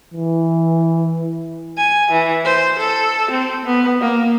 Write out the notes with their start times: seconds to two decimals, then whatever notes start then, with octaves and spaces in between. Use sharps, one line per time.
0.14 E3
1.77 G#5
2.11 E3
2.45 C5
2.78 A4
3.31 C4
3.65 B3
4.00 A#3